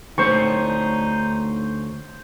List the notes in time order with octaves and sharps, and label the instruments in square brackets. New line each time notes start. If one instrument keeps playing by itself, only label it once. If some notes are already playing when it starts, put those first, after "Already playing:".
[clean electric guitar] D2 A3 C#5 [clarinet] D#4 [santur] C5 C#6